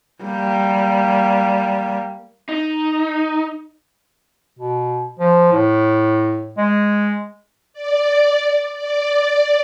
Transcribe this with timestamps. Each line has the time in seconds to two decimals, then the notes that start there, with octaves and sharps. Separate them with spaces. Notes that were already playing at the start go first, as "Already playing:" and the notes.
0.24 G3 A#3
2.49 D#4
4.59 B2
5.19 F3
5.52 A2
6.57 G#3
7.73 D5
8.77 D5